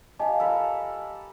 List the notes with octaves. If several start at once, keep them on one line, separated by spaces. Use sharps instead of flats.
G4 D#5 F5 G#5 A5
A4 A#4 B5